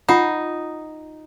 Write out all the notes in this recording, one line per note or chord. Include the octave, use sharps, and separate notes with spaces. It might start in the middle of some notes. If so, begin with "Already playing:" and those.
D#4 F4 F#5 A#5